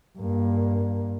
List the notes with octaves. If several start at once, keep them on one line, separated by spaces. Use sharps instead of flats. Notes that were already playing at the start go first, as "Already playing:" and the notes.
G2 A#3